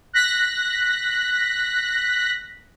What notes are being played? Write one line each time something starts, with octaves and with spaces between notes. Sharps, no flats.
F#6 A#6 B6